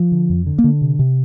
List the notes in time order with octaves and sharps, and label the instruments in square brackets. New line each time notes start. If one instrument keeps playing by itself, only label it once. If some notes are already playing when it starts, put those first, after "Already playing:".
Already playing: [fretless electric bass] F3
D3
F2
D3
A#3
D3
C3
C3